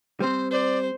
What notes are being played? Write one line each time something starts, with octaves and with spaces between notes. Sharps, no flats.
G3 C4 C5
C5 D5